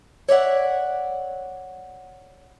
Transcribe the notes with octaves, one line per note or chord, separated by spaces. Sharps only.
C#5 D5 E5 F#5